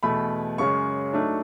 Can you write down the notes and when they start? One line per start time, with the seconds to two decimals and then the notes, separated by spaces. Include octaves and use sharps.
0.03 E2 B2 A3 B5
0.58 F#2 C#3 G#3 C#6
1.13 G#2 F#3 A3 D4